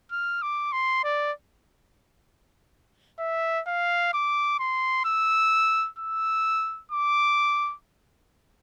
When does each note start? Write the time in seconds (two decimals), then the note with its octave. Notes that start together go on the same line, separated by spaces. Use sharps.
0.12 F6
0.42 D6
0.73 C6
1.04 D5
3.20 E5
3.67 F5
4.14 D6
4.60 C6
5.05 E6
5.99 E6
6.91 D6